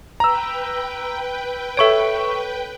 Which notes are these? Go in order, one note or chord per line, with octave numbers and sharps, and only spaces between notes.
B4 G5 A#5 E6
A4 C#5 E5 C#6 D7